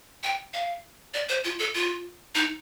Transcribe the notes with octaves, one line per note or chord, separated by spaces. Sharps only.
G5
F5
D5
C5
F4
A4
F4
D#4